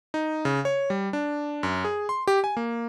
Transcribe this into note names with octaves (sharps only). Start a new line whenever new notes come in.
D#4
C#3
C#5
G3
D4
F#2
G#4
C6
G4
G#5
A#3